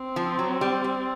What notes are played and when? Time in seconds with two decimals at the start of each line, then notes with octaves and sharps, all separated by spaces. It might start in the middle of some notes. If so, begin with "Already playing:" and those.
Already playing: C4
0.16 F3
0.39 F#3
0.61 G3
0.84 G3